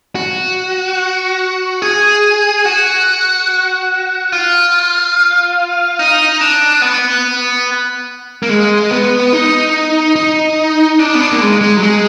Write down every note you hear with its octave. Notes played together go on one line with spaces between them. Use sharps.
F#4
G#4
F#4
F4
D#4
D4
B3
A#3
G#3
B3
D#4
D#4
D4
B3
D4
A#3
G#3
G#3
F#3
G#3